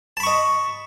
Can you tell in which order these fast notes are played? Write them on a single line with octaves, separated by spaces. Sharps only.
A5 B5 C#6 D#5